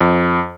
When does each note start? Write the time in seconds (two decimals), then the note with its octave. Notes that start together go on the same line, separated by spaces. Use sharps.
0.01 F2